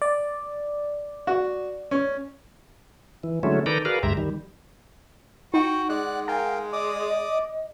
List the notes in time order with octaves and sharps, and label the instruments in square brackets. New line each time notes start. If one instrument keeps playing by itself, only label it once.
[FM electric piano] D5
[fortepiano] F#4
C#4
[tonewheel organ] E3
D3 F#3 G#3 A3 C#4 E4
D#3 A4 B4 D5 G5 A#5
F#4 G#4 A#4 B4 D5 F5
D2 G2 G#3 G4 E5 A#5
D#3 G3
[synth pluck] D#4 [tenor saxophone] F#4 [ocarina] F#5 [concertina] G5
[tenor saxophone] G#3 [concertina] D5 F#6
[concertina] A#4 F5 G5 [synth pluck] G#5
[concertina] D5 D6 D#6 [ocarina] D#5